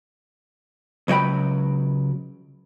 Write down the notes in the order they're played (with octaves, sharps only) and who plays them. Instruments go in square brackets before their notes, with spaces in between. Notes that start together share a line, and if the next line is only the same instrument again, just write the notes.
[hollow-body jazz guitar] C#2 F#3 C#5 G5 B5